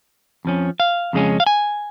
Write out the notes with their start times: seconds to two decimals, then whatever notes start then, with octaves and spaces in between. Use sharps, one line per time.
0.45 F2 F3 C#4
0.80 F5
1.13 F2 C#3 G#3 C#4
1.40 F5
1.46 G#5